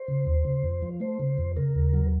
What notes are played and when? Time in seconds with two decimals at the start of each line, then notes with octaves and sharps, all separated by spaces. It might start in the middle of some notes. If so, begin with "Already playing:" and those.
Already playing: C5
0.08 C#3
0.26 D#2
0.45 C#3
0.64 F2
0.82 F3
1.00 A3 C5
1.20 C#3
1.38 F2
1.57 C#3 A#4
1.75 D#2
1.93 F#3